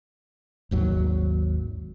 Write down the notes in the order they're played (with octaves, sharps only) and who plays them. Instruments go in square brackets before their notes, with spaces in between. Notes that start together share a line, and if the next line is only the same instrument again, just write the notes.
[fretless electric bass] G#1 D#2 F#3